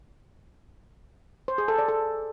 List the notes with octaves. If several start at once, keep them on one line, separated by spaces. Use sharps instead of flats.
C5
G#4
A4
D5
A4